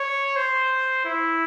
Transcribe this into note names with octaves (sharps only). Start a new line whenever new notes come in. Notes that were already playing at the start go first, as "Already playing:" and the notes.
Already playing: C#5
C5
E4